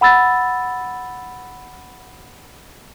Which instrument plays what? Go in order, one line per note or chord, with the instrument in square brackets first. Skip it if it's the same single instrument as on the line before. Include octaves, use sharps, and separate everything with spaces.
[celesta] F#5 B5 E6 A6